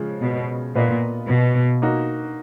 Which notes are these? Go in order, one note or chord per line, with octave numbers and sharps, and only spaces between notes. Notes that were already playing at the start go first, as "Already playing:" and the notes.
Already playing: C#3 F3 G#3
B2
A#2 B3 F4 B4 D#5
B2
A#3 D#4 F#4